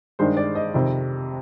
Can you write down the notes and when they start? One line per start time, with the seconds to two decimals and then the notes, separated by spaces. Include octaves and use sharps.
0.19 G2 D#3 G#3 D4 C5
0.37 D5
0.55 D#5
0.74 F2 C3 D#3